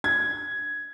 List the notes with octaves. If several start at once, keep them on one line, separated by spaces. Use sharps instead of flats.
G#6